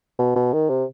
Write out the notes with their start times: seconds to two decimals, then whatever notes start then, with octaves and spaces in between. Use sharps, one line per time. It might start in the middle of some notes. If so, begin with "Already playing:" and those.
0.19 B2
0.36 B2
0.53 D#3
0.69 C3